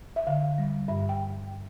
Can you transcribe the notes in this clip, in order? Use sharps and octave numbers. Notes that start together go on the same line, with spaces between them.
E5
D3 F5
G3
G2 E5
G5